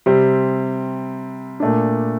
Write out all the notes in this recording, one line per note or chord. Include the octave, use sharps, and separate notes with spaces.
C3 G3 C4
A#2 A3 D4